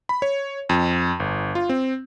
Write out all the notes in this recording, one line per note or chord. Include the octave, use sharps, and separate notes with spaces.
B5
C#5
F2
G1
F4
C4